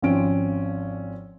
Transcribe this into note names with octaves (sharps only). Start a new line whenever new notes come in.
G#1 F3 C4 C#4 D7